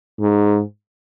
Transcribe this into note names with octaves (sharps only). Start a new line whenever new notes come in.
G#2